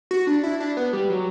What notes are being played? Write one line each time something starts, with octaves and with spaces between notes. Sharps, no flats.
F#4
D4
E4
D4
B3
G3
F#3